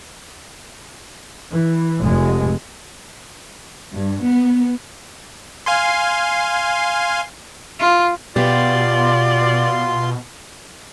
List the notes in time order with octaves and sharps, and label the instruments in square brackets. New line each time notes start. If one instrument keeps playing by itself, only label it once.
[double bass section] E3
F1 G#3
[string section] G2
B3
[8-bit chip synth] F5 G#5 C6
[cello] F4
[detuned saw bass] B2 [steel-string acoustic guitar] B3 G4 [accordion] F4 C6 [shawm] D5